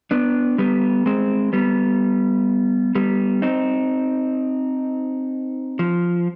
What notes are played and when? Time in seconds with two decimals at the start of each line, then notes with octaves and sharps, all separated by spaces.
0.11 B3 D4
0.58 G3 B3
1.06 G#3 C4
1.53 G3 B3
2.95 G3 B3
3.42 C4 D#4
5.79 F3